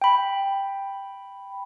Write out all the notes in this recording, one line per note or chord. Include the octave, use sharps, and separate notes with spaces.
G5 B5